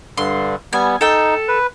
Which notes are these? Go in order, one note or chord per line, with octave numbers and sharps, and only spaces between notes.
G2 D3 C6
G3 B3 G#5
D#4 A4 G5
B4